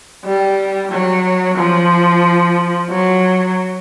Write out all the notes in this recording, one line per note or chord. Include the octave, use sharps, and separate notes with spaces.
G3
F#3
F3
F#3